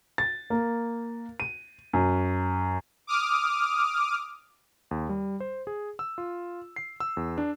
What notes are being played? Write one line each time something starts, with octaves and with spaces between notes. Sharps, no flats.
A6
A#3
D#7
F#2
D6 D#6 F6
D#2
G3
C5
G#4
E6
F4
C7
E6
E2
D4